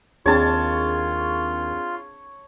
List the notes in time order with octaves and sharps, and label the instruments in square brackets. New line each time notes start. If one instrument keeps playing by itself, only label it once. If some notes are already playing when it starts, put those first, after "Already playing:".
[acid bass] D#2 [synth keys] C4 D4 G#4 [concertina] F4 [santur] C#5 A5